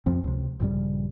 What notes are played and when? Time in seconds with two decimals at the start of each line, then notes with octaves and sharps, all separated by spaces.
0.06 F2 F3 C4
0.24 C#2 C3
0.60 A#1 G2 C#3 G3